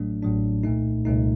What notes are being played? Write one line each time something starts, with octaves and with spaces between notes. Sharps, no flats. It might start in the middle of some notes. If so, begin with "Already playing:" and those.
Already playing: A1 A2 F#3 A3 D4
A1 A2 F#3 A3 D4
C2 A#2 A3 D#4
C2 A#2 A3 D#4